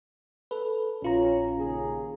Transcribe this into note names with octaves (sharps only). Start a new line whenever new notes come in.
A4 B4
A#1 C#4 F4 A#5
D#2 C#3 G#4